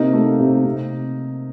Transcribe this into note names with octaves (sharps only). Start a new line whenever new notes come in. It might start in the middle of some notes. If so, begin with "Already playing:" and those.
Already playing: C3 A#3 D#4
A3
C3
C3